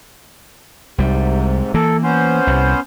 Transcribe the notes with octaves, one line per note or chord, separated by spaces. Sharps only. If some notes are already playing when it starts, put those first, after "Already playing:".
C2 G#2 C3 G3
E3 A#3 A4
B3 C#4 C5
C2 C3